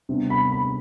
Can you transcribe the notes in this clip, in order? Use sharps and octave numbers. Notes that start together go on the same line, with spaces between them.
C3 G3 B3 D4
B5
B5